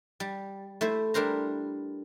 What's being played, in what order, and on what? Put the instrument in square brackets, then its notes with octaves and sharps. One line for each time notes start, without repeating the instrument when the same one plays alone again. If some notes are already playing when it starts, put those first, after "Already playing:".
[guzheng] G3
A3 E4 C5
G3 D4 A#4 C5 A#5